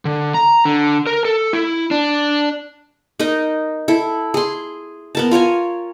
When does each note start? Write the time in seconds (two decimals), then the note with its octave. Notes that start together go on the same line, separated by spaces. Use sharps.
0.05 D3
0.34 A#5
0.65 D3
1.07 A#4
1.25 A4
1.53 E4
1.91 D4
3.19 D#4 A#4 D#5
3.88 E4 A4
4.34 G#4 C6
5.15 B3 A#4 A5
5.31 F4 A#4 C#5 G#5